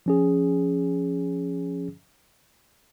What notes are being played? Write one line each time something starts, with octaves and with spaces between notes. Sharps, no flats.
F3 C#4 G#4